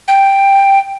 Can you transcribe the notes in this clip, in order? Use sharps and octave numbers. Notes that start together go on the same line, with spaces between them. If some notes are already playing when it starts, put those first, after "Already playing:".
G5